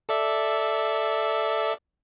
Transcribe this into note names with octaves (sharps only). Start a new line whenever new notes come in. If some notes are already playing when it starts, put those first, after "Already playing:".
A4 D5 E5